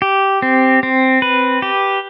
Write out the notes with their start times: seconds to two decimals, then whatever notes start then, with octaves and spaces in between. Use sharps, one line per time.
0.02 G4
0.42 C4
0.83 C4
1.22 B4
1.62 G4